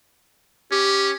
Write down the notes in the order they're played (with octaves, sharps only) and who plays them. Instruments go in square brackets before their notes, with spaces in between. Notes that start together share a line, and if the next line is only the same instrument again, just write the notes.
[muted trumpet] C#4 [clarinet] G4